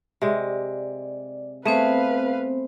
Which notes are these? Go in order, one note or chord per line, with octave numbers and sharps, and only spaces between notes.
C3 G#3 D5
A3 B3 C4 G#4 B4 C5 F5